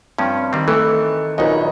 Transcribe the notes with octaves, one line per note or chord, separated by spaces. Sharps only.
G2 F3 C4 C#4
D#3 G3 C4
E3 A3
A#1 F#2 D#4 F#4 B4